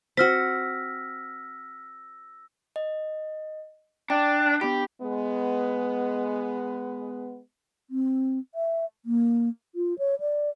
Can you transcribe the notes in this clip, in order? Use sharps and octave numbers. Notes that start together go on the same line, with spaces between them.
C4 F#4 C5 E6 F6 A#6 B6
D#5
D4 G5
B3 D4 G4 B5
G#3 B3
C4
E5
A#3
F4
C#5
D5